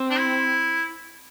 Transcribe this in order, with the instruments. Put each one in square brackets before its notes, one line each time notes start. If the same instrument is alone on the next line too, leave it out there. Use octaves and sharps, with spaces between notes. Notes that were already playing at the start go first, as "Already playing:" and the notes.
Already playing: [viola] C4
[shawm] D4
E4